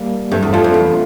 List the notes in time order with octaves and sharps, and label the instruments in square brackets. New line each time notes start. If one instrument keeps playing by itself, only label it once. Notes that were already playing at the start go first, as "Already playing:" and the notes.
Already playing: [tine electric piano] G3 A#3
[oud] G2 [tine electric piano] A3 C4
[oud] E2
[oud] F2 [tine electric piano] D4 F4
[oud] F2
E2